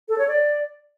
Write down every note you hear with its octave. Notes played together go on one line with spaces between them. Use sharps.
A4
C#5
D5